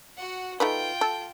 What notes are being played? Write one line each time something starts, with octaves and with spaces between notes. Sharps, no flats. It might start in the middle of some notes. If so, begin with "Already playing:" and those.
F#4 F#5
A3 D#4 F4 B4 G5
A4